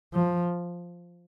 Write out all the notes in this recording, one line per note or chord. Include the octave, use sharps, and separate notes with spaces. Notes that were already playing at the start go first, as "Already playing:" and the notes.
F3